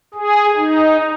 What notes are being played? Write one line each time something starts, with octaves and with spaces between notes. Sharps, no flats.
G#4
D#4